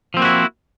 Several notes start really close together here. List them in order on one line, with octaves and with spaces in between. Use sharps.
F3 C4 A#3 F#4 E4